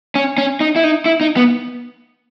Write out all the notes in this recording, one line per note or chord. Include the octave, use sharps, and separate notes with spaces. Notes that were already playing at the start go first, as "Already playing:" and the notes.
C#4
C#4
D#4
E4
D#4
E4
D#4
B3